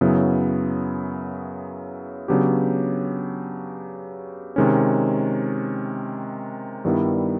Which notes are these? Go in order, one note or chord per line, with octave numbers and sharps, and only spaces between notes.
F#2 C#3 F#3 B3 E4
C#3 F#3 B3 D4 G4
C3 D#3 G#3 C#4
G2 D#3 G3 B3 E4